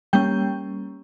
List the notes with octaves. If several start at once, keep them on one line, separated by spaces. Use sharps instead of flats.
G3 A#3 C#4 G5 G6